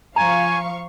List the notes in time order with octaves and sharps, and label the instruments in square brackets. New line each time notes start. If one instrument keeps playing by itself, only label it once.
[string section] F3 F5 C#6 [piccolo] G#5 [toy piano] A#5